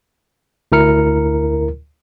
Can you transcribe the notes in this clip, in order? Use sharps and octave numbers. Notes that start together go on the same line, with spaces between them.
D2 E4 A#4 F6 C#7